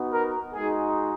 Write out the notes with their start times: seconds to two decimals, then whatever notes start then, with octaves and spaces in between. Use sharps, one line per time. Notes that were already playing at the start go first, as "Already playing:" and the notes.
Already playing: B3 D#4 F#4
0.13 A#4
0.53 G#3 D#4 F#4 G#4